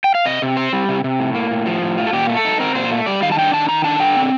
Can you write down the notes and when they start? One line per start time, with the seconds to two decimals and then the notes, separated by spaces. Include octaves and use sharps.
0.04 G5
0.15 F5
0.25 C3 D#5
0.42 C3
0.57 C4 C5
0.73 G3
0.89 C3
1.04 C3
1.20 A2
1.35 A#3
1.51 A2
1.66 F3
1.82 A2
1.98 F4
2.07 A4
2.13 A#2 G4
2.29 A3
2.37 A4
2.45 D#4
2.60 C4 A#4
2.75 A#2 C5
2.91 A3
3.06 G3 D5
3.22 D#3 F5
3.32 A5
3.39 D4 G5
3.53 D#3 A5
3.69 D#3 A#5
3.84 D4 A5
4.00 D3 G5
4.16 C4